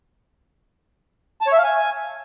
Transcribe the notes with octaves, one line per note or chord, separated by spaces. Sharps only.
A5
C#5
E5
F5
G#5